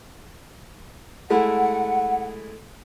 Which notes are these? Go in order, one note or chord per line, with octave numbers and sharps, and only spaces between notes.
G#3 A3 E4 F#5